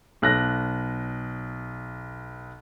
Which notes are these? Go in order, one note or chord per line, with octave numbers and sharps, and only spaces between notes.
B1 F#6 A#6